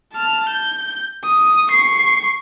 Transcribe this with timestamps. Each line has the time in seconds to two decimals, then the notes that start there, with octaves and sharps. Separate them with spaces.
0.13 A5 F6
0.49 G6
1.24 D#6
1.70 C#6 C7